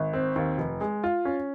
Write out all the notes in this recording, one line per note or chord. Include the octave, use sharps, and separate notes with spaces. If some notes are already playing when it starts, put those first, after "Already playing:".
Already playing: G#1
C4
D#2
F1
G#3
F4
C#4